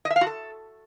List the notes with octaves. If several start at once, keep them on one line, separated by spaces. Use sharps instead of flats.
D#5
E5
F5
F#4
A4